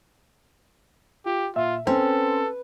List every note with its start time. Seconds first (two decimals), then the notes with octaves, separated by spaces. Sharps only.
1.26 F4 G4
1.56 A#2 F4 E5
1.87 C4 C#4 A4 B4